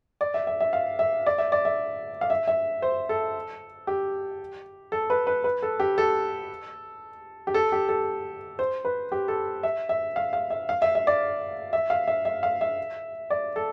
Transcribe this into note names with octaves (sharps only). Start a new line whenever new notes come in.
D5
E5
E5
E5
F5
E5
D5
E5
D5
E5
F5
E5
E5
C5
A4
G4
A4
B4
B4
B4
A4
G4
A4
G4
A4
G4
A4
C5
B4
G4
A4
E5
E5
F5
F5
E5
F5
E5
E5
D5
E5
F5
E5
E5
F5
E5
D5
A4